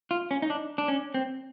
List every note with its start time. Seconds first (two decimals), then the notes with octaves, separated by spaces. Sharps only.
0.11 F4
0.31 C#4
0.42 D#4
0.50 D4
0.78 D4
0.88 C#4
1.14 C4